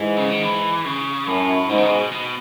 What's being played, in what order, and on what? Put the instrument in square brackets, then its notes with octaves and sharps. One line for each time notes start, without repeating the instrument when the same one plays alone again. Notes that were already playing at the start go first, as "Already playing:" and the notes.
Already playing: [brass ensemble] G#2 [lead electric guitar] E3
[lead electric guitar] C#3
D#3
E3
C#3
[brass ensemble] F#2 [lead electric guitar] A2
[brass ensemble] G#2 [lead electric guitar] B2
[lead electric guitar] C#3
B2
B2